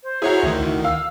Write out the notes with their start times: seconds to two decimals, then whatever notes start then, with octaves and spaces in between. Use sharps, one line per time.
0.03 C5
0.22 E4 F#4 G#4 C#5 A#5
0.43 D2 D#3
0.84 F5 E6